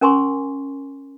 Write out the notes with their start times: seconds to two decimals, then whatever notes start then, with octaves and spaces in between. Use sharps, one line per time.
0.01 C#4 A#4 G#5 C6 C#6